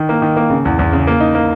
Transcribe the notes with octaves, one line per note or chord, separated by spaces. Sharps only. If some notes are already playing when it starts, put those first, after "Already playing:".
Already playing: D#3
A#3
D#3
A#3
C#3
E2
E2
C#3
A#3
D#4
A#3